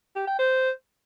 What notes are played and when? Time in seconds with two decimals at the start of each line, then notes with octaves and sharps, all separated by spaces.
0.16 G4
0.27 G5
0.39 C5